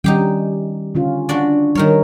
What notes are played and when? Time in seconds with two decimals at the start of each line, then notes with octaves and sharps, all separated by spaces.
0.04 D#3 G3 C#4 D#4 G4 G5
0.95 D3 C#4 F4
1.29 D4 F#4 D5
1.75 D#3 G3 D#4 A#4 C#5